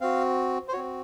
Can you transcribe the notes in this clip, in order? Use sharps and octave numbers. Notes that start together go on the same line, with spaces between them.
C4 F#4 F5
C5
C4 F#4 C#5